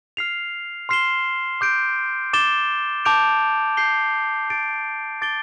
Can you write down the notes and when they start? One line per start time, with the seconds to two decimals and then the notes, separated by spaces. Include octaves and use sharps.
0.17 F6 C7 F7
0.89 C6 F6 C7 E7 G7
1.61 D6 G6 D7
2.33 D6 A6 E7 G7
3.05 A5 D6 G6 D7 F7
3.77 G6 C7 G7
4.49 D6 A6 D7
5.22 D6 A6 D7 G7